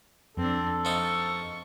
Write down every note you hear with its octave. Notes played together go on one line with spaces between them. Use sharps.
F2 C4 D4 A4
F3 D#4 C#6